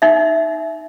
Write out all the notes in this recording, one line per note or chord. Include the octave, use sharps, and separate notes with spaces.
D#4 E5